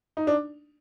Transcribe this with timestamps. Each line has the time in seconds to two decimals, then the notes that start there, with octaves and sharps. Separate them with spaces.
0.17 D#4
0.27 D4